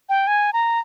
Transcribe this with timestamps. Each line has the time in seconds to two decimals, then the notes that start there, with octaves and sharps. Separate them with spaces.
0.09 G5
0.27 G#5
0.53 A#5